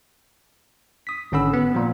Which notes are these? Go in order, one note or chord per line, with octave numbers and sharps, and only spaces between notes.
D#6 B6
G#1 D3 C#4 F#5 B5 E6
B3
A#2 F3